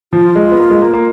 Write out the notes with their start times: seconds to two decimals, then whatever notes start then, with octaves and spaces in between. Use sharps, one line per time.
0.13 F3 F4
0.36 G#3
0.52 B3
0.59 A#3
0.70 G#3
0.82 A#3
0.93 A#3